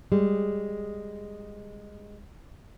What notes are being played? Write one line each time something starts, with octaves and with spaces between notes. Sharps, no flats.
G3 G#3